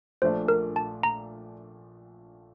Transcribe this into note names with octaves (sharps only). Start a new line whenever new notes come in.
A#1 A#2 F3 A3 D4 C5
A#4
A5
A#5